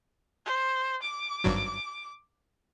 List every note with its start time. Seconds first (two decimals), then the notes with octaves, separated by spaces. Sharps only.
0.46 C5
1.02 D6
1.44 G#1 G2 F#3